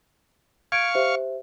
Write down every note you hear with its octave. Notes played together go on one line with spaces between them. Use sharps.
F5 C#6 G#6 D7
G4 C5 E5